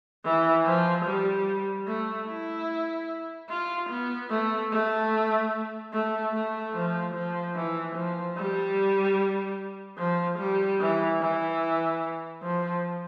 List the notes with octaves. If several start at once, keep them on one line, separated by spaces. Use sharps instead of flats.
E3
F3
G3
A3
E4
F4
B3
A3
A3
A3
A3
F3
F3
E3
F3
G3
F3
G3
E3
E3
F3